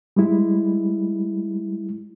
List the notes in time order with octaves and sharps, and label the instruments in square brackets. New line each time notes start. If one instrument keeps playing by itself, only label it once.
[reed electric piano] G3 G#3 E4